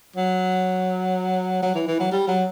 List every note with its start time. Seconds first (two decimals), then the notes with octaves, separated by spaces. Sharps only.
0.16 F#3
1.62 F#3
1.75 E3
1.88 E3
2.00 F#3
2.12 G3
2.28 F#3